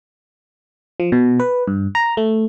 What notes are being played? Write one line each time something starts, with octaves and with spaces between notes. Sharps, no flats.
F3
B2
B4
G2
A#5
A3